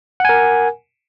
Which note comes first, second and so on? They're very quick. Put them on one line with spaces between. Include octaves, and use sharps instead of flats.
F#5 G#5 A#4